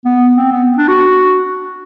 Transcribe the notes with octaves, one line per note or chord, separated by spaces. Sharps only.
B3
C4
B3
D4
F#4